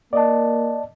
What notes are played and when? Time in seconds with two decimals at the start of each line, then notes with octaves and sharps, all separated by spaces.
0.13 A#3 D5 D#5 A5